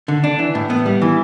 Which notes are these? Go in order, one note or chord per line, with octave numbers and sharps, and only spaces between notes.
D3
D4
E3
A2
B3
G3
E3